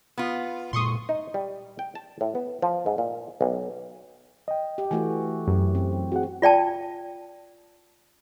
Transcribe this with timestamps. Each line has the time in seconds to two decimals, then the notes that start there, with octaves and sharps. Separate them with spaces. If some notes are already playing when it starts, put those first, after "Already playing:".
0.18 B3 F4
0.73 A#2 G#3 C6 C#6 D#6
1.09 D#4
1.34 G3
1.79 G5
1.95 A5
2.21 A2
2.35 B3
2.62 F3
2.86 G#2
2.98 A#2
3.41 B1
4.48 D#5 G5
4.78 G4
4.91 E3 A3 F#4 G#5
5.48 F#2 G4
5.75 C4
6.12 C4 F#4 G#4 F#5
6.42 F4 D5 G5 A5